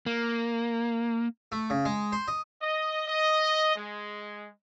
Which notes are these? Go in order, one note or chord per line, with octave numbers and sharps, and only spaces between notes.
A#3
A3
C#3
G#3
C5
D#5
D#5
D#5
G#3